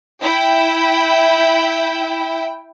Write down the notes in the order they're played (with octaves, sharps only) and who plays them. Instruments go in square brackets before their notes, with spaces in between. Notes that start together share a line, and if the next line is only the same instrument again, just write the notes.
[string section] E4 G5